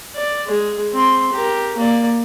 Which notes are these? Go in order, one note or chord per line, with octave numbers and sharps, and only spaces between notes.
D5
G#3 G#4
C4 C6
G4 A#4
A#3 D5